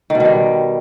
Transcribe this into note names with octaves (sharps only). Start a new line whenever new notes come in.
D#3
B2
D#3
G3